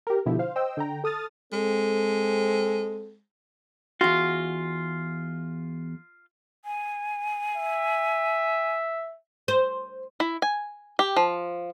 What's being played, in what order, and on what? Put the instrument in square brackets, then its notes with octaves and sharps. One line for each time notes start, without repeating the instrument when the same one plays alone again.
[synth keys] G4 A#4
B2 D3 F3 E4 G4
C5 F5
C5 D#5 G5 E6
D3 G5 A#5
A4 D#6 F6 A6
[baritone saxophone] G#3 [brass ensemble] C4 A4
[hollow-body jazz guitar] E2 F#4 [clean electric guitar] F4
[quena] G#5
[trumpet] E5
[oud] C5
[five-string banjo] E4
G#5
G4
F3